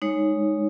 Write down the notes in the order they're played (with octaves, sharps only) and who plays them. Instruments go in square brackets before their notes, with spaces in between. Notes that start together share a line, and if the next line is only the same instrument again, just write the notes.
[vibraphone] G#3 D#4 C#5